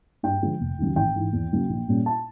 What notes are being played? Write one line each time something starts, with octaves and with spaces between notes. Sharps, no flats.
G2 G5
D3 F3 G#3
F1
D#2 C#3 F#3
A1 G5
G#2 E3
E2
C#3 F#3 A#3
A#1
A#2 G3 A#3 C#4
A5